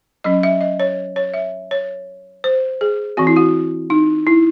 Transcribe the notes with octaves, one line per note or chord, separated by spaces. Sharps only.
F#3 C#4 D#5
E5
D#5
C#5
C#5
E5
C#5
C5
G#4
E3 C4 F#4
E4
F#4
D#4
E4